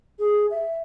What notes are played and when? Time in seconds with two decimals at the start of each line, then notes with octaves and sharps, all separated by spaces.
0.19 G#4
0.51 E5